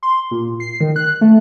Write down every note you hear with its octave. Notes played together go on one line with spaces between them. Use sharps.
C6
A#2
C7
D#3
F#6
A3